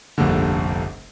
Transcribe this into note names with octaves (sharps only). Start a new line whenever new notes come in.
F1 A#1 G2 A#2 D3